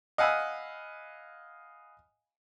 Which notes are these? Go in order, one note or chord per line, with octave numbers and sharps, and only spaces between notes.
D#5 F5 F#5 G#5 B5 E6